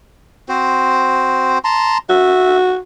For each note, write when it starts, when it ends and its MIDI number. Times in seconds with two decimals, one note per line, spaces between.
0.49 1.58 60
0.49 1.58 66
0.49 1.58 72
1.64 1.98 81
1.64 1.98 82
1.64 1.98 84
2.09 2.78 66
2.09 2.57 76